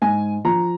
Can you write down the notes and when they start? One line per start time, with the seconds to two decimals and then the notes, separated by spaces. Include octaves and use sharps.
0.02 G#2 G#5
0.45 F3 A#5